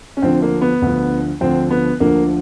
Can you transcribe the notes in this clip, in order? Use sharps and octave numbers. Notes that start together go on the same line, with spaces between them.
C#4
D2 D3 F3 C4
A#3
B3
D2 D3 F3
D2 D3 F3 C4
B3
D2 D3 F3 A#3